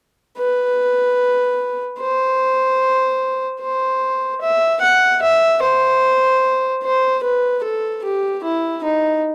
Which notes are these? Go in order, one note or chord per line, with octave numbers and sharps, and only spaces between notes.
B4
C5
C5
E5
F#5
E5
C5
C5
B4
A4
G4
E4
D#4